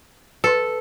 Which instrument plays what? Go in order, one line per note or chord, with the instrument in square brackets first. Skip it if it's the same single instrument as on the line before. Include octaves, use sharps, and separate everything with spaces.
[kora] A4 [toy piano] B4 C6